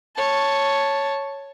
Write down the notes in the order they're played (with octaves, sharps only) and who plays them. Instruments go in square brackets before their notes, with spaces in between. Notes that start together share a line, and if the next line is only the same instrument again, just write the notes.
[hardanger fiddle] C#5 A5